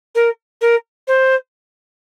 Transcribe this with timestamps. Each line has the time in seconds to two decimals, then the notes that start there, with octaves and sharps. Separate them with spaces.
0.15 A#4
0.61 A#4
1.07 C5